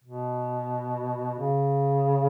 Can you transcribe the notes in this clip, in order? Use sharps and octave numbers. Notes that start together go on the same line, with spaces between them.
B2
C#3